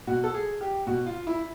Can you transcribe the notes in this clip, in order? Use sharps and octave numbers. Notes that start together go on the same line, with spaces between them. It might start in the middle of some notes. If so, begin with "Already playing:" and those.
B2 F#4
A4
G#4
G4
B2 F#4
F4
E4